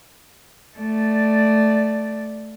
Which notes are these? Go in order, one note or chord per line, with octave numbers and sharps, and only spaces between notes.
A3 D5